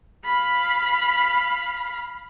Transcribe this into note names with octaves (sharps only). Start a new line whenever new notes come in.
F5 B5